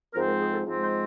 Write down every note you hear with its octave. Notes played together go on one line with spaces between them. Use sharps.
G#2 F3 G#3 C4 A#4
A#4
G#4
A4
G#2 F3 G#3 C4
C5